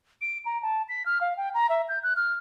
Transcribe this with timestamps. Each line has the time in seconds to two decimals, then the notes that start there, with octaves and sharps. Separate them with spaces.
0.21 D7
0.45 A#5
0.62 A5
0.89 B6
1.06 F6
1.21 F5
1.37 G5
1.54 A#5
1.69 E5
1.89 G6
2.03 F#6
2.16 F6